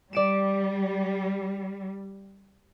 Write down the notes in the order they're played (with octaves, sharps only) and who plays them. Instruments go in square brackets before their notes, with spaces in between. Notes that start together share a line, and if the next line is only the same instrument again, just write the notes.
[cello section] G3 [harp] D5 D7 E7